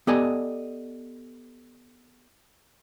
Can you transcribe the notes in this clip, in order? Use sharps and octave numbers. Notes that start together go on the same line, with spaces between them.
B3 G4 A4 D5 D#5 G#5